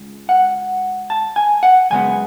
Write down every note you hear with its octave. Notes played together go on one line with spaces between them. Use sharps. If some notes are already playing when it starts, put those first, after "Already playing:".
Already playing: C#2
F#5
A5
G#5
F#5
F#2 C#3 G#3 B3 G#5